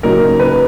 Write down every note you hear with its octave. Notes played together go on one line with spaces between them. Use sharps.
C#3 F#3 A#3 D#4 A#4
B4